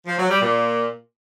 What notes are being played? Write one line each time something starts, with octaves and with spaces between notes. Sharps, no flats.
F3
F#3
G3
A#2